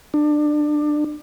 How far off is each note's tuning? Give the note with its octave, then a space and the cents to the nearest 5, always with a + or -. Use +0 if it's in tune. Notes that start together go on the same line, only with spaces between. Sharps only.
D4 +25